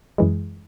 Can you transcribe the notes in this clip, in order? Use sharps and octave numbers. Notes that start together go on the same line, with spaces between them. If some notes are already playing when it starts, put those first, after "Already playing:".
F#2 E3 G#3